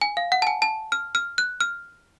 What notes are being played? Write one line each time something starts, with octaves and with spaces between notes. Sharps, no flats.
G#5
F5
F#5
A5
G#5
A5
F6
F6
F#6
F6